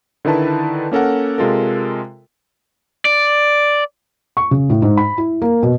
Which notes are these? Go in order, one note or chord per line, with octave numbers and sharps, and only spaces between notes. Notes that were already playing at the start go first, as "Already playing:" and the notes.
D3 D#3 E4 B4 A5
A#3 C#4 A4 A#4 F#5
C3 G#3 F4 A4 A#4
D5
C#6
C#3
A2
G#2
B5
E4
A#3
B2